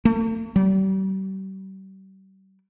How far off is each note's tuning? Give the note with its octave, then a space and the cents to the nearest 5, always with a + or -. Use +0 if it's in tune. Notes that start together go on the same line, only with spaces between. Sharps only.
A3 +40
G3 -40